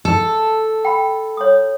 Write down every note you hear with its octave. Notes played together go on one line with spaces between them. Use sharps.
A4
G5 B5
C#5 D#6